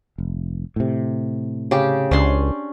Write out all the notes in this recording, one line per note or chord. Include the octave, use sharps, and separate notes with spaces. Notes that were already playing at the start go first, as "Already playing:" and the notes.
F1
A2 C3
C#3 G4
C#2 C#4 D4 C6